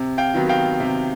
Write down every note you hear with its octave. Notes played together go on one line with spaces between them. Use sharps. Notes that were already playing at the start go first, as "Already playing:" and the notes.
Already playing: C3
F5 G5
D#3 F#3 B3
F5 G5
C3